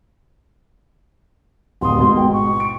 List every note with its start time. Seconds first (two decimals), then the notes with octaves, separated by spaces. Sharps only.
1.81 D1 D#2 C6 D#6
1.98 A1 G#2 B2
2.16 G5
2.33 C#6
2.60 D7